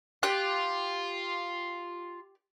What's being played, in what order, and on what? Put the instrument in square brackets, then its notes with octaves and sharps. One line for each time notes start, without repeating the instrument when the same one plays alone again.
[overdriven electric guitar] F4 [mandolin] G4 F#6